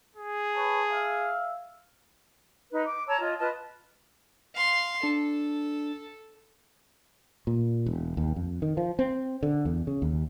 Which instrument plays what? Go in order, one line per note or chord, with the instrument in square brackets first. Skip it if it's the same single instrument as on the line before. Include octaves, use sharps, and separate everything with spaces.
[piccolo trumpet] G#4
[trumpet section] B4 C#5 A5
E5 F5
[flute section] D#4 B4
D6
C#5 A5 A#5 E6
F4 D#5
F4 B4 D#5 A5
[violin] F5 C6
[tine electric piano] D4 [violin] A4
[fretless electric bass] A#2
E1
D#2
F2
D#3
F3
C4
D3
E2
C#3
D#2